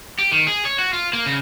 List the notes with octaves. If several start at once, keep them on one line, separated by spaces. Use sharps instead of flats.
G4
D#3
G#4
C#5
F#4
F4
A#3
C#3